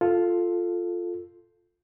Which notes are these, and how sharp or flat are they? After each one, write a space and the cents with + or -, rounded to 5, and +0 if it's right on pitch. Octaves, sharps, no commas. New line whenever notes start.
F4 +0 A4 +0